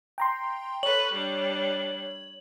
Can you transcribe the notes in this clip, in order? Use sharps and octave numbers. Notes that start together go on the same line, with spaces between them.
G5 A#5 C6
A4 B4 C#5 F#7
G3 D4